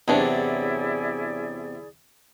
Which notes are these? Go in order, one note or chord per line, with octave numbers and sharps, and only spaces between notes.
E2 C3 F#3 C#4 D4 E4 G#4 D5